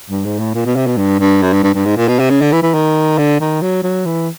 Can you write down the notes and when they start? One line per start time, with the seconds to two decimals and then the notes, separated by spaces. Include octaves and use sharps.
0.10 G2
0.25 G#2
0.39 A2
0.54 A#2
0.66 B2
0.76 C3
0.87 B2
0.97 G2
1.20 G2
1.42 F#2
1.53 G2
1.63 G2
1.74 G2
1.86 G#2
1.97 A#2
2.08 B2
2.19 C3
2.30 C#3
2.41 D3
2.52 E3
2.63 E3
2.74 D#3
3.18 D3
3.40 D#3
3.62 F#3
3.83 F#3
4.05 E3